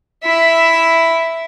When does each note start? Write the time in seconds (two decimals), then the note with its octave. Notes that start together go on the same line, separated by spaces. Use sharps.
0.23 E4 E5